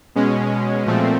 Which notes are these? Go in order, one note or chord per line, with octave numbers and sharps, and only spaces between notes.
B2 G#3 C#4
A#2 F3 A3 C4